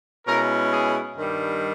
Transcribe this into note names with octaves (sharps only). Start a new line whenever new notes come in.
B2 G#3 C#4 E4 A#4
G#4
G2 D#3 G3